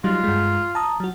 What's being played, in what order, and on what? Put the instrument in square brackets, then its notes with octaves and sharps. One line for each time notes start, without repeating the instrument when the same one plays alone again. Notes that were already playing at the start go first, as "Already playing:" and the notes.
[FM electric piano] F#3 G3 D#4 [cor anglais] F4
[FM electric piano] G2 G#3
A5 A#5 D#6
F#3 F#4